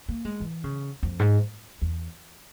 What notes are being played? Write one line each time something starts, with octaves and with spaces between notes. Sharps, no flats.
A#3
G#3
E3
C#3
F2
G#2
E2